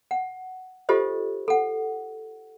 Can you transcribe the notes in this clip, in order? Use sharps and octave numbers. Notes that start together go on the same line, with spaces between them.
F#5
F4 G4 A4 C5 D#5
A4 F#5